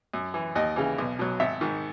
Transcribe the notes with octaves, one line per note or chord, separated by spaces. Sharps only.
F#2
E3
D#2 D#5
C#3 E3
B1
B2 F#3
G#1 E5
G#2 D#3